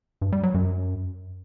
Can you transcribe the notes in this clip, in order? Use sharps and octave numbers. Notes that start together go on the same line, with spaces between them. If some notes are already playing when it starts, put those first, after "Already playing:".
G2
G3
F#3
F#2